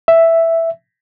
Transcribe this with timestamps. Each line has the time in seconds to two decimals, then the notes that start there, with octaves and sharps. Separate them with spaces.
0.08 E5